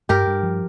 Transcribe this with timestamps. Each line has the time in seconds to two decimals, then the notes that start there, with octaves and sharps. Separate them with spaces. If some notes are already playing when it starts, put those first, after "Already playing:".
0.09 G2 G4 A#4
0.27 G2
0.43 F3